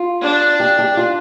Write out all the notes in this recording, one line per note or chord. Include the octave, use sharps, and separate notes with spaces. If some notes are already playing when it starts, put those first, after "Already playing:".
Already playing: F4
D4
G4
G4
F4